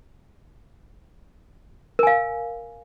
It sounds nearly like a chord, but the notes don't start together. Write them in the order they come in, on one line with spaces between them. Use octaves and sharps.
A#4 G#5 F5